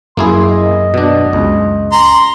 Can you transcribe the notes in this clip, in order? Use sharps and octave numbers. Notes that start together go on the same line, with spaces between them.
F#2 A#3 E4 G#4 C6
D#5
B2 D4
C#2
A#5 C6